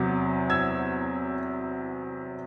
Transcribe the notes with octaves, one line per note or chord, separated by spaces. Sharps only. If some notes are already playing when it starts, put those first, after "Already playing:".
Already playing: E2 C3 F#3
E6 G#6